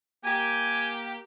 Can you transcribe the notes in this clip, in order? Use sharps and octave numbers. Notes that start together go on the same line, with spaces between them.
A#3 G4 G#5